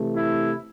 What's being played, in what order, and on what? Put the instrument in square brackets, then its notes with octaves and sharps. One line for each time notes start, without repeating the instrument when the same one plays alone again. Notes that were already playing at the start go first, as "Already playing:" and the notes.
Already playing: [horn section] C3 E3 A3
E4